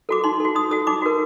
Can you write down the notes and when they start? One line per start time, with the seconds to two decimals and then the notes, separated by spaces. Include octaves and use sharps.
0.09 F#4 A4 D6
0.24 D#4 C6
0.40 F#4 A4
0.55 D#4 D#6
0.71 F#4 A4 D#6
0.87 D#4 D6
1.02 F#4 A#4